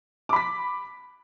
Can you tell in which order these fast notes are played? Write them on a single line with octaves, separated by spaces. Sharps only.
D6 B5 B6